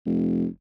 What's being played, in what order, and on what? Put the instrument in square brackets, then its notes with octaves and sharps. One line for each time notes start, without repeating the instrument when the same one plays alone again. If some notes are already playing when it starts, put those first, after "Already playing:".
[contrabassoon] F1